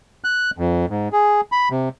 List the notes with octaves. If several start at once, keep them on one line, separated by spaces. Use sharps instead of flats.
F#6
F2
G#2
G#4
B5
C3